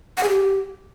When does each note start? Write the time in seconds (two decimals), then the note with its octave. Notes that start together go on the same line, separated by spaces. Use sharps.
0.17 F#5
0.23 G#4
0.29 G4